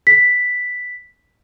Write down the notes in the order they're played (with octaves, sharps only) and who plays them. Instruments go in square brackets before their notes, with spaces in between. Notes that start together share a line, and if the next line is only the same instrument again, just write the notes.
[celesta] B6